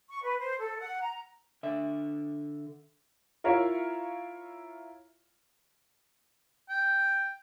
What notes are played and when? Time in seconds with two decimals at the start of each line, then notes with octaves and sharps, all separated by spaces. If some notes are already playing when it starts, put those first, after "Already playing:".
0.10 C#6
0.22 B4
0.39 C5
0.59 A4
0.78 F#5
1.01 A#5
1.63 D3 E5
3.44 E4 F4 A#4 C#5 E5 F5
6.69 G5